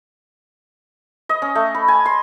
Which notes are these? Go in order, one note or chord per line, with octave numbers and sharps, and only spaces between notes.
D#5
C#4
A3
B5
G#5
C6